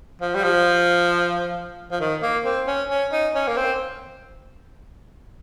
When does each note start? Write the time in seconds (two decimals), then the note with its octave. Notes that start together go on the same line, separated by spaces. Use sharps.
0.21 F3
0.35 G3
0.43 F3
1.91 F3
2.00 D#3
2.22 A#3
2.45 C4
2.67 C#4
2.90 C#4
3.12 D#4
3.35 C#4
3.47 A#3
3.57 C4